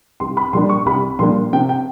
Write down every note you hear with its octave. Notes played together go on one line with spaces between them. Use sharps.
C2 C6
B5
A#2 G3 A#3 D4 C6
C#6
C2 B5
A#2 G3 A#3 D4 C6
C3 G5
G5